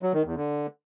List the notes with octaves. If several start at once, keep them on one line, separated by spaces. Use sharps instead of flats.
F#3
D#3
E2
D3